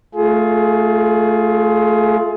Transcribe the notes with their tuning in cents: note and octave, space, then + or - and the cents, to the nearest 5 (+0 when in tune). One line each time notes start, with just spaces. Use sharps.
A3 +0 F4 +0 G#4 +25